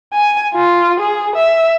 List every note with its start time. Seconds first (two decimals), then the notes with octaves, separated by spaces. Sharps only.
0.13 G#5
0.54 F4
1.00 G#4
1.36 E5